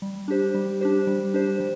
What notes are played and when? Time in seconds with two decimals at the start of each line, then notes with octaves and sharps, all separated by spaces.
0.02 G3
0.28 D4 G4 C5
0.54 G3
0.81 D4 G4 C5
1.07 G3
1.34 D4 G4 C5
1.60 G3